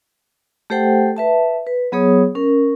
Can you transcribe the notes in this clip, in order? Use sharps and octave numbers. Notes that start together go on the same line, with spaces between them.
A3 G4 A4 C5 F#5 G5
B4 E5 A5
B4
F#3 B3 G#4 C#5 D#6
C#4 A#4